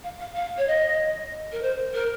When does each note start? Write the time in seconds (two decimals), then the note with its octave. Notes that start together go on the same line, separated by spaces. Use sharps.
0.04 F5
0.20 F5
0.36 F5
0.57 C#5
0.67 D#5
1.52 A#4
1.62 C5
1.94 A#4